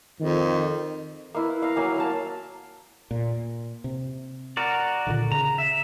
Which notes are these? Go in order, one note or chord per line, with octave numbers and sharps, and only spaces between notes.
F2 D#3
A#3 E4 B4
F5 A#5
F#3 A#3 G#5
A#4 F5 A5
A#2
C3
F#4 A#4 D5
A#2 D3 D#3
C#3 A#5
E5